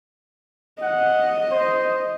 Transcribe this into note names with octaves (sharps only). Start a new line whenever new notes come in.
D#5 F#5
C5